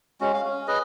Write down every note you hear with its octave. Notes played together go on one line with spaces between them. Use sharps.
G#3 C#4 F#4
F5
C#4
G#4 B4 D#5